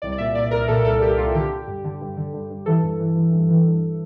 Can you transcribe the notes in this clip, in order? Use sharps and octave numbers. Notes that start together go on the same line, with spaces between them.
C2 D5
D5
A#2 E5
A#2 D5
C2 A#4
A#2 A4
C2 A4
C2 G4
C2 F4
D3 G4
D3
G2
D3
G2
D3
G2
G2
E3 A4
G2
E3
E3
G2
E3
G2